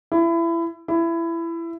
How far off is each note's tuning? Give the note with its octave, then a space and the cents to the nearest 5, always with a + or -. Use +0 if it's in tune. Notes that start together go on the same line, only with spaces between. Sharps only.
E4 +25
E4 +20